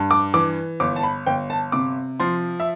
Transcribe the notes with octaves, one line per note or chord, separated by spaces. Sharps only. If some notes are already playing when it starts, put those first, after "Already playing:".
Already playing: G2
D6
E3 D6
G1 D6
A5
B5
G1 G5
A5
C3 D6
F3 C6
E5